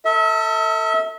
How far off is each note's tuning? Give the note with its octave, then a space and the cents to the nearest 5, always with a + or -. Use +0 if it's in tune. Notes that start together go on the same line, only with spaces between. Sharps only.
A4 +30 E5 -35